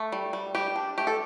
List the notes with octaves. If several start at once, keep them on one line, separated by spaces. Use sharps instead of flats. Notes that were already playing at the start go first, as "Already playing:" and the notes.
Already playing: A3
G3
G3
G3 G4
D4
A3 G4
A4